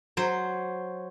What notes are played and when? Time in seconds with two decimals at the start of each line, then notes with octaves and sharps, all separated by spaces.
0.17 F#3 C5